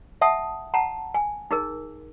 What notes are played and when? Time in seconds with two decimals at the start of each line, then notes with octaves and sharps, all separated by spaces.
0.21 E5 F#5 A5 D#6
0.74 F#5 A5 A#5
1.14 G#5
1.51 D#4 G#4 A#4